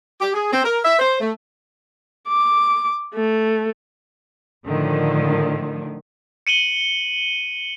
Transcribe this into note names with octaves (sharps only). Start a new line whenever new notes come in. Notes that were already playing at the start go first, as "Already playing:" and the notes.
G4
G#4
C4
A#4
E5
C5
A3
D6
A3
A2 D3 D#3 F3
C#7 D#7 F#7 G7